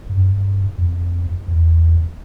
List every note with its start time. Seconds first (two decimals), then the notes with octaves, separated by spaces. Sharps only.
0.09 G2
0.17 F#2
0.24 G2
0.78 F2
1.48 E2